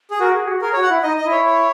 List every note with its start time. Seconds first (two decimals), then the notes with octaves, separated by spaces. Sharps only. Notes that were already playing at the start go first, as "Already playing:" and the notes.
0.11 G#4
0.19 F#4 A#4
0.34 G#4
0.48 F#4
0.61 G#4 A#4
0.73 C#5
0.76 F#4
0.82 F#5
0.89 E4
1.03 D#4 D#5
1.17 D#5
1.24 E4
1.31 C#5
1.46 C#5